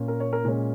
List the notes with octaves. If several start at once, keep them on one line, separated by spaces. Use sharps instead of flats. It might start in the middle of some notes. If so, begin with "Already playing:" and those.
Already playing: A#2 A#3 C#4
A#4
C#5
A#4
A#2 G#3 C#4